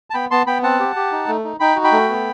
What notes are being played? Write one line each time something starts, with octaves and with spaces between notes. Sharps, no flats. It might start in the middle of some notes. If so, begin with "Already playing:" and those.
A5
B3 G5 B5
B3 A5 C6
B3 G5 B5
C4 F#5 A5
G4
G4
D#4
A3
D#4
D#4 G5 B5
F#4
G5 B5
A3
B3